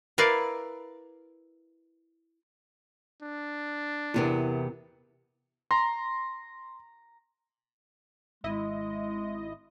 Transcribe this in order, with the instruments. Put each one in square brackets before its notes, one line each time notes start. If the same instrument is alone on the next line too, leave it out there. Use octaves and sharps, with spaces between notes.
[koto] E4 A#4 B4 D5 F5
[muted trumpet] D4
[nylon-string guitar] E2 C3 B3 [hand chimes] E4 A#4
[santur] A#5 [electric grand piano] C6
[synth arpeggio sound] G#1 E4 D#5 [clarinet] G#3